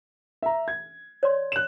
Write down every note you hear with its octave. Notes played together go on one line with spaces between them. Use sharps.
E5 A#5
G#6
C#5 D5 C6
F#6 E7